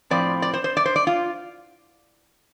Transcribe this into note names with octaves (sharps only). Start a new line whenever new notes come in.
A2 F3 C4 D5
D5
C5
C5
D5
C5
D5
F4